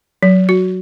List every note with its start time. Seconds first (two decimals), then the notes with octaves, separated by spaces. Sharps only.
0.23 F#3
0.49 F#4